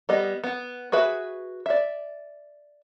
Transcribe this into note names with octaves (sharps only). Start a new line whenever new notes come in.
G3 B3 D#5
B3
F#4 G#4 B4 E5
D5 E5